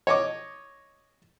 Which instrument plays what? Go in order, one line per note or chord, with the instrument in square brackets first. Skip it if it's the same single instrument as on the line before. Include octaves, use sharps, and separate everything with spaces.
[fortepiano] C#5 D#5 D6